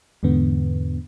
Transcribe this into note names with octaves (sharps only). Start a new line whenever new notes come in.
E2 G#2 D3 B3